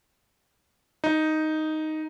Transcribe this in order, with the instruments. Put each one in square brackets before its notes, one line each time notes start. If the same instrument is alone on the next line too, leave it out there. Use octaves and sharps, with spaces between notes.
[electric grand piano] D#4